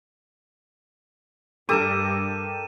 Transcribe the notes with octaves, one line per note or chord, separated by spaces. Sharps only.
G2 G4 A4 A#4 D6 D#6 D#7 E7